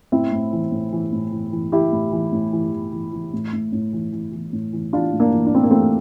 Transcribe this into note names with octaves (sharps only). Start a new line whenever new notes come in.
A2 C4 E4
A2
E3
A2
E3
A2
E3
E3
E3 E4 G4
A2
E3
A2
E3
E3
E3
E3
A2
A2
A2
E3
E3
E3
A2
E3
E3 D4 F4
A2
A#3 D4
E3
D4
A2 C4
A#3
E3 A3 C4